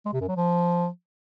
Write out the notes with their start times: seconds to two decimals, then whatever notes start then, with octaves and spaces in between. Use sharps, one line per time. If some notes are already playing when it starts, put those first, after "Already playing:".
0.05 G#3
0.13 C3
0.21 F#2
0.28 F#3
0.36 F3